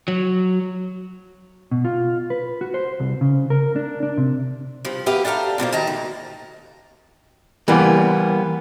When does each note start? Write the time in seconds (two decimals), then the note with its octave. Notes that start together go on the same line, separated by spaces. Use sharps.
0.08 F#3
1.71 B2
1.85 F4
2.30 B4
2.61 F#4
2.74 C5
3.00 C2
3.21 C#3
3.50 A#4
3.76 D4
4.03 D4
4.18 C3
4.85 G2 F3
5.06 A#3 B3 G4 E5 F5
5.25 D4 G4 A4 F5 A#5
5.58 B2 D3 F3 A#3
5.73 D#3 A5 A#5
5.87 D2
7.68 E3 G3 A#3 B3